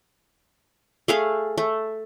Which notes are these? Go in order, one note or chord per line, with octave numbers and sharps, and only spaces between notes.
A3 G#4 F5
A3